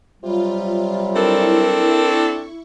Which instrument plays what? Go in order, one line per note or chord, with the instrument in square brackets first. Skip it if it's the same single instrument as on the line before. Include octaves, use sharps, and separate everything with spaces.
[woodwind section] C3 F#3 G3 [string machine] F4
[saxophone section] C4 D4 A4 [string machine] E4 C#6 [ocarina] A#4